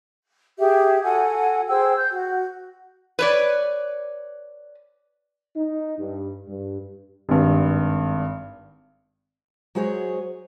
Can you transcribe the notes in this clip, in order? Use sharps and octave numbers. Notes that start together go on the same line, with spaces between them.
G4 G#4 E5
F#4 A4 F#5 G#5
G#4 C5 G5 E6
G6
F#4
B4 C#5 D5
D#4
G2
G2
G#1 G2
F#3 G#3 F#4 G#4 C5 C#5